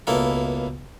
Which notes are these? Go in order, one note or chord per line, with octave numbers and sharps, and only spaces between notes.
C#2 B2 A#3 E4 A4